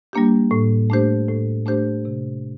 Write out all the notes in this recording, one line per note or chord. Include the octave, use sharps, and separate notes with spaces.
G3 A#3 D4 G4
A2
A3 D4 G4 C5
A2
A3 D4 G4 C5
C3